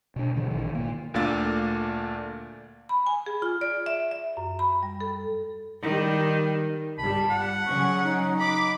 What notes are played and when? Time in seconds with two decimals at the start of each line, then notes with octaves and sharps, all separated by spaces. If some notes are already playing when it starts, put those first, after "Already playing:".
0.16 B2 D4
0.36 G2 B2 D3 E3
0.50 A#1 D#3 E3
0.75 A#2 A#3
1.14 D2 A#2 A3 D4 F5 A6
2.89 B5
3.07 G#5
3.26 G#4
3.42 F4
3.61 D5
3.86 E5
4.11 E5
4.37 F#2
4.59 B5
4.83 G3
5.01 A4
5.82 D#3 G3
6.98 G1 G3 A5 B5
7.30 F#5
7.67 C#3 F#3 C#4 C#6
8.04 D#4
8.40 B5 D6